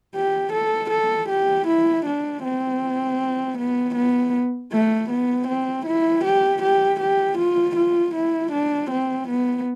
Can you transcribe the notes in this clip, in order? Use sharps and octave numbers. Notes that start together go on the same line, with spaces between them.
G4
A4
A4
G4
E4
D4
C4
B3
B3
A3
B3
C4
E4
G4
G4
G4
F4
F4
E4
D4
C4
B3